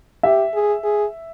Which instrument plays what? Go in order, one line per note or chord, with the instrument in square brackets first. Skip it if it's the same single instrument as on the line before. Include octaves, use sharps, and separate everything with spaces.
[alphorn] G4 [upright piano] E5
[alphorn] G#4
G#4